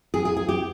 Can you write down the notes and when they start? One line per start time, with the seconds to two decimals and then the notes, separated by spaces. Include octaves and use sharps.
0.14 G#4
0.25 G#4
0.37 G#4
0.49 G4